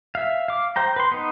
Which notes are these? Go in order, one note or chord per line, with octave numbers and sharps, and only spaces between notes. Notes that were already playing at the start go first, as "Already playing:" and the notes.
E5 F5
F5 D6
C5 G5 A#5
B4 C6
B3 D#4